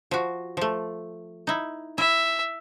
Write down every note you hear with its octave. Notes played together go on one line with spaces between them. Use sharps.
F3 F#4
F3 A3
D#4 E4
E4 E5